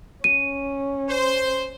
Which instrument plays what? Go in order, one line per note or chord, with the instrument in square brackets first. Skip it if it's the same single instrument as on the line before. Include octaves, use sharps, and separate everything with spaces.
[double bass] C#4 [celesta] D#7
[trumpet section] C5